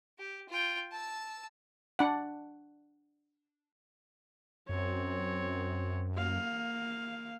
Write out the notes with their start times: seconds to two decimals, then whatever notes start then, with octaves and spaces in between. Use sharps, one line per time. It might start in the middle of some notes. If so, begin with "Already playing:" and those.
0.19 G4
0.49 F4 G5
0.91 A5 E6
1.99 D4 F#5
4.69 F#2 C4 C#5
6.16 A#3 F5